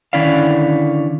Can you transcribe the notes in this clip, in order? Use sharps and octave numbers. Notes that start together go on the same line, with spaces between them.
D3 D#3 C#4 E4 D5 F5